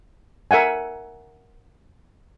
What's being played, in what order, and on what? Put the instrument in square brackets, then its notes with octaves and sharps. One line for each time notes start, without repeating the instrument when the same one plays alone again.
[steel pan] A#4 E5 F#5 G#5